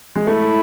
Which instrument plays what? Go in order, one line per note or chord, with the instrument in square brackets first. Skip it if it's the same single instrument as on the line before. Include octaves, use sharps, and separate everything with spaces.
[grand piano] G#3
[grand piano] A3 [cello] E4